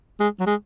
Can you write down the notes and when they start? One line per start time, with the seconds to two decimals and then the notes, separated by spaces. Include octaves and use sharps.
0.20 G#3
0.40 F#3
0.47 G#3